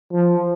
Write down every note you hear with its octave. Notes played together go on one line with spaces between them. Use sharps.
F3